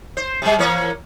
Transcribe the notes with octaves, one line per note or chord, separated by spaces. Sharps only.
C5
C3 G3
E3 A#3 C#5